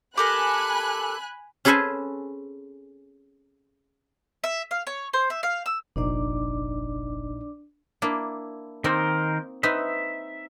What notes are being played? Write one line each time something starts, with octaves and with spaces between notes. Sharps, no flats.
G4 A4 A#4 G#5 B5 F#6
C#4 G#4 A4 B4 C5 G#5
E5
F5
C#5
C5
E5
F5
E6
F1 A#1 A#2 D4 D#4 D5 D6
A#3 D4 E4
D#3 A#3 C4 D#4 A#4 C5
C4 D#4 B4 E5